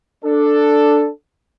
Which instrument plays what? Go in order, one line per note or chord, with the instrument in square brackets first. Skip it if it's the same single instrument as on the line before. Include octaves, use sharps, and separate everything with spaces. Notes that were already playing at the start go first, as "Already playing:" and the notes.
[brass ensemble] D4 A4